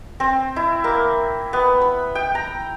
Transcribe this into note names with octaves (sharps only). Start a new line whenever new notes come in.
C4
E4
A#3
B3
B5
G5
A#5